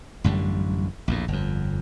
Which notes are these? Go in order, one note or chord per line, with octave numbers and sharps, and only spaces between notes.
A1 F#2 D3 G3
A#1 E2 A2
G1 F2